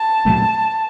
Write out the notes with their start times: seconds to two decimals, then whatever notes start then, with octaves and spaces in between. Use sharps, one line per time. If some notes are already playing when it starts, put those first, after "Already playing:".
Already playing: A5
0.25 A#2 F#3 A3 C4